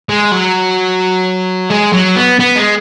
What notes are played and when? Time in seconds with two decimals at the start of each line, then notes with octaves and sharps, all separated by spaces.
0.09 G#3
0.32 F#3
1.70 G#3
1.93 F#3
2.16 B3
2.40 B3
2.56 G#3